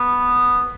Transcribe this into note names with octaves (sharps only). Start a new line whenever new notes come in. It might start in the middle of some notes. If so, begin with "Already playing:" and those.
Already playing: B3